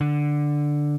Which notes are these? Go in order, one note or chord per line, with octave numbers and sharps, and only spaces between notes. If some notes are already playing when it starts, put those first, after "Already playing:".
D3